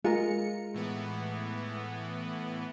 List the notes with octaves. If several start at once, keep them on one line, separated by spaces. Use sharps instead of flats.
G#3 F4 A#4 C#7
A2 E3 B3